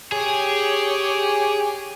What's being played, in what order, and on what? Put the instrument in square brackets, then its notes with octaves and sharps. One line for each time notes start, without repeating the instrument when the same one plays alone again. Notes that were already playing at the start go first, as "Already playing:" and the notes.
[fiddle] G4 C#5 [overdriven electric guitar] G#4